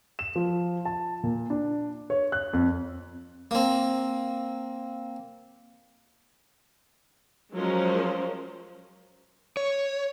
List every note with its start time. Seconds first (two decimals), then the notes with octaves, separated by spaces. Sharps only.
0.19 E7
0.36 F3
0.85 A5
1.24 A#2
1.50 D4
2.10 C#5
2.32 F#6
2.53 F2
3.51 A#3 C4
7.55 F3 F#3 G#3 C#4 A#4 C5
9.57 C#5